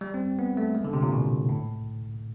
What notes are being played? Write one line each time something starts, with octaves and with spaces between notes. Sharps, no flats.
G3
C4
B3
A3
G#3
D3
C3
A#2
B2
A2